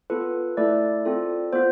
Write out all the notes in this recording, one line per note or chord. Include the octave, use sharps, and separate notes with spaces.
B3 F4 A4 B4
A3 E4 A4 D5
C4 F4 A4
B3 F4 C5